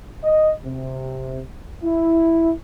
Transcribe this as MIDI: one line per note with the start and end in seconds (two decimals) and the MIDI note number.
0.22 0.52 75
0.64 1.40 48
1.83 2.52 64